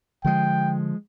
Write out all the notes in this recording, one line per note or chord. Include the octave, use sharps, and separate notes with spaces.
D3 F3 G#3 G5